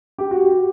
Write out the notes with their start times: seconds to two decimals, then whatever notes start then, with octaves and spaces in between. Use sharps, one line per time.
0.18 G4
0.31 F#4
0.44 G4